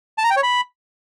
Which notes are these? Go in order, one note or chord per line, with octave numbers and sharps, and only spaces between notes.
A5
A#5
G5
C#5
B5